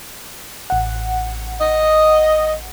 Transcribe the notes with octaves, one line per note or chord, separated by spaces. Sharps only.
A1 F#5
D#5